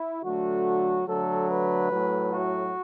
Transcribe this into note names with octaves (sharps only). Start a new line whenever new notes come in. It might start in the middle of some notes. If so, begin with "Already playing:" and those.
Already playing: E4
D3 F#3 A3 F#4
D3 F#3 A3 A4
B4
A2 F#3 A3
F#4